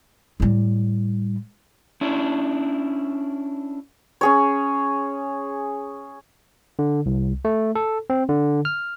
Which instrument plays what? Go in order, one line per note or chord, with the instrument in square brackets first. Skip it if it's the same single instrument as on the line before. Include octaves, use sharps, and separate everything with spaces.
[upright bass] A2 G3
[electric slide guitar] C#4 D4 E4
[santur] C#4 G#4 C#5
[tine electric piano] D3
C2
A3
A4
C4
D3
F6